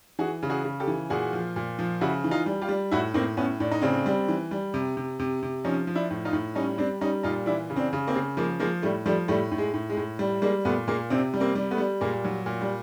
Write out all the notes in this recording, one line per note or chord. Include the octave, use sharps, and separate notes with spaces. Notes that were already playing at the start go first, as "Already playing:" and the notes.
E3 F#4 G#4
C#3
F#4 G#4
C#3
G4 A4
E3
A#2 F#4 G#4
F3
A#2
F3
C#3 E4 F#4
E3
D#4 F4
G3
F4 G4
G3
A2 E4 F#4
A2 A#3 C4
A2 B3 C#4
A2 D4
D#4
C#3 C4 D4
G3
E3
G3
C3
C3
C3
C3
F3 C#4 D#4
F3
D4 E4
A2
D#4 F4
A2
G3 C#4 D#4
G3 C4 D4
G3 C#4 D#4
A#2 D#4 F4
E3 D4 E4
C#3
C4 D4
C#3
A#3 C4
C#3
F3 G#3 A#3
F3 G#3 A#3
A2 G3 A3
F3 G3 A3
A2 G3 A3
A2
G#3
A2
G#3
A2
G3
G3 G#3 A#3
A#2 A3 B3
A#2 G#3 A#3
C3 C4 D4
G3
A#3 C4
G3
A3 B3
G3
A#2 G#3 A#3
F#3
A#2
G3